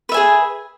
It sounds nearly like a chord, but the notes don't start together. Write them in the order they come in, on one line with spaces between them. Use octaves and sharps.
B4 E5 G#5 G#4